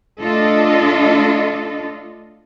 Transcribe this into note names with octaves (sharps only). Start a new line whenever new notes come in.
A3 D4 F4 A4 D#5